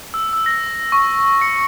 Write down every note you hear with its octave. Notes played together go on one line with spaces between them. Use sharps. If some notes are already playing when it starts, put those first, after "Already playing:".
E6
E6
A#6
C#6
C#7